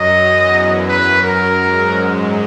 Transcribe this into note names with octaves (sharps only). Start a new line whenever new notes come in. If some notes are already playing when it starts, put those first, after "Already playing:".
Already playing: F#2 F#3 D#5
E2 E3
F#2 F#3 B4
A#4
G#2 G#3